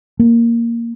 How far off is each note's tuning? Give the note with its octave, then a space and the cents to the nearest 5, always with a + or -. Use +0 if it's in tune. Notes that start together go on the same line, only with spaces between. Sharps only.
A#3 -5